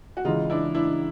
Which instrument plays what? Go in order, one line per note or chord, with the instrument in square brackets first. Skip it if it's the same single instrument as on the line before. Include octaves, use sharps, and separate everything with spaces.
[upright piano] F#4
[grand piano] C#3 E3 G#3 [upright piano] D#4 F4
[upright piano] D4 E4
D4 E4